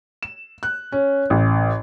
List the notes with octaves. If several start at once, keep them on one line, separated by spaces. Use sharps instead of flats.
E7
F#6
C#4
A1